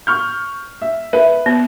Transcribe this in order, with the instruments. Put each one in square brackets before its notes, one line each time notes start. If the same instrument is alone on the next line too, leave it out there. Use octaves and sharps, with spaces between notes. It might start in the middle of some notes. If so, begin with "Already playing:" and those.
[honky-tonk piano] C#6 F6 G6
E5
[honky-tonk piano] B4 [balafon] E5
[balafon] B3